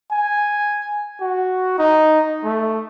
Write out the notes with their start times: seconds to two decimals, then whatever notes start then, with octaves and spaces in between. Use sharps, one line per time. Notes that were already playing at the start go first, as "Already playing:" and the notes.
0.11 G#5
1.21 F#4
1.79 D#4
2.44 A3